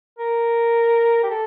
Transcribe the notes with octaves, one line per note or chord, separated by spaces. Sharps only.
A#4
G4
A4